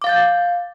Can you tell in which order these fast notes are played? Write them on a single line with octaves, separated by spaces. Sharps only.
D6 F5 A6 G6